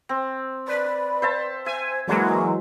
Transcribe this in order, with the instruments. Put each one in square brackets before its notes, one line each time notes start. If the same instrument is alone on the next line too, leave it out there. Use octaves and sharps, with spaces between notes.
[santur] C4
[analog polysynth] B4 [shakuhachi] D5
[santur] C5 E5 A5
[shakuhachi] C5 [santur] E5 [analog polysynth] G#5
[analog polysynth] E3 F#3 G#3 [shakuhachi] A#3